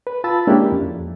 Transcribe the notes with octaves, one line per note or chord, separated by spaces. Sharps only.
B4
F4 A5 B5 E6 A6
G#3 A#3 C#4 D4 E4 G4
F2